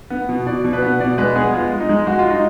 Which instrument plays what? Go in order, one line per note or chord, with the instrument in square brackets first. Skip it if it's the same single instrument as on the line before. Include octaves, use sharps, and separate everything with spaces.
[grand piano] B3
B2
B2 D5
B2
B4
B3
B2 D5
G#3 B4
B3 G#4
G#3 F4
G#3
D#4
G#3
G#3 F#4
F4
D#4